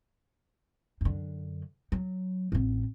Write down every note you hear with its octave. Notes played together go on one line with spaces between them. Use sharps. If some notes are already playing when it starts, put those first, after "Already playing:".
F#2 D3
F#3
A1 C4